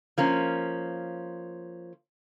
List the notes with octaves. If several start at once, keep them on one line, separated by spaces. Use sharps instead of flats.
F3 A#3 C#4